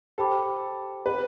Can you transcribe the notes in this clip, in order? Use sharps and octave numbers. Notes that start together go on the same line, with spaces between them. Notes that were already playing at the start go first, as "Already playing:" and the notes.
G4 A4 C5 G5 B5 D6
B4